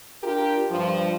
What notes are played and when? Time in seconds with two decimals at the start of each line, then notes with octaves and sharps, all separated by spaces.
0.23 D4 F4 G4 A#4
0.70 G2 F3